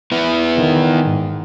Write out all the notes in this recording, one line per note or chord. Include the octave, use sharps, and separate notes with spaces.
B3 E4
D#3
G#2